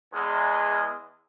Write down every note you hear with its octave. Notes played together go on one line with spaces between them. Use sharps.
E2 G#3